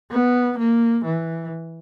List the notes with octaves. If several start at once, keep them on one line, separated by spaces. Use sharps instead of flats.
B3
A#3
E3